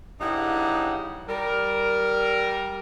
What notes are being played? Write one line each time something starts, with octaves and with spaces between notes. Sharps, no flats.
G2 C#3 D#4 E4 G4 F#5
G3 A#4